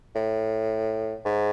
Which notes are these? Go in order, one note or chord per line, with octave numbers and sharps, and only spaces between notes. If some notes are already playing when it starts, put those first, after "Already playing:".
A2
G#2